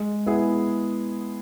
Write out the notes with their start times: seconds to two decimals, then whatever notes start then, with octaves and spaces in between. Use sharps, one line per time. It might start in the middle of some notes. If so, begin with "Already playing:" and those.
Already playing: G#3
0.26 B3 E4 G#4